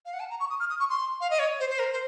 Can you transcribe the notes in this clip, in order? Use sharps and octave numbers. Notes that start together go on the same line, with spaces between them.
F5
F#5
A5
A#5
C#6
D#6
F6
D#6
C#6
C6
F5
D#5
C#5
C5
C5
A#4
C5